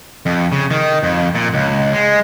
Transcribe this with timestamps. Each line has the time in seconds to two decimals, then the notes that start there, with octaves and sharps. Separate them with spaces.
0.26 F2
0.52 C#3
0.71 D#3
1.03 F2
1.35 A#2
1.54 C#2
1.93 G#3